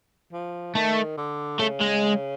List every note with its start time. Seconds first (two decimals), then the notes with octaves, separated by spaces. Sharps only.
0.33 F3
0.75 D#3 A3
1.17 D3
1.60 C#3 A3
1.81 G#3